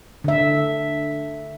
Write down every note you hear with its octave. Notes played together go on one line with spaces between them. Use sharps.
D3 E5